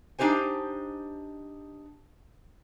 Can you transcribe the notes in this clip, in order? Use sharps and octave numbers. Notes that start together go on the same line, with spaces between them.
D4 D#4 G4 C5 G#5